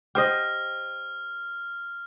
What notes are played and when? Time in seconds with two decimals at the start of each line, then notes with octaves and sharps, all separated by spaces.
0.15 G4 C5 D#5 F6